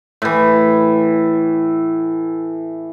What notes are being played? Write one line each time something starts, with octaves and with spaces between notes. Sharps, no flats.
A2 E3